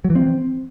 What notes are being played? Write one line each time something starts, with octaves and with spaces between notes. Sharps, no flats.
F#3
E3
C4